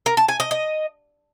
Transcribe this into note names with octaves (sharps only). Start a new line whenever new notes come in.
A#4
A5
G#5
D#5
D#5